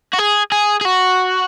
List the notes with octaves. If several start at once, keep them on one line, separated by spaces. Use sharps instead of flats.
F#4
G#4
G#4
G#4
F#4